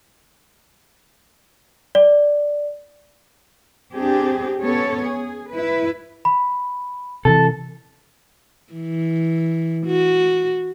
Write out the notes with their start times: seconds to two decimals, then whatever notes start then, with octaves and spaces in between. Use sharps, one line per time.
1.95 D5
3.93 C4 D4 G4 G#4
4.61 B3 C#4 A4 C#5
5.05 G#4
5.50 E4 B4
6.25 B5
7.25 C3 D#3 E3 A4
8.73 E3
9.87 F#4